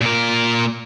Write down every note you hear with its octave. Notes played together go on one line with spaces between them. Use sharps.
A#2 A#4